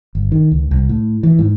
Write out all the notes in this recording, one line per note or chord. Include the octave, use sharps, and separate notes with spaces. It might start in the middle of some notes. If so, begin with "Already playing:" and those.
G1
D#3
C#2
C2
A2
E3
G#2